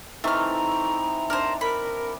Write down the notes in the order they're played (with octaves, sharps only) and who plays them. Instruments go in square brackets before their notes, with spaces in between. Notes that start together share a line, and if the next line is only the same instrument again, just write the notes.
[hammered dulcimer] E3 C4 D#4 [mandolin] A3 F6 [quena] A#5
[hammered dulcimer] D4 [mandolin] A#4 C5
[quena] A#4 [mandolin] B5